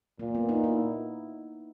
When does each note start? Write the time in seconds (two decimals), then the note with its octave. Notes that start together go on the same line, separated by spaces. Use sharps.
0.19 A#2 A#3
0.35 B3
0.49 D#4
0.64 E4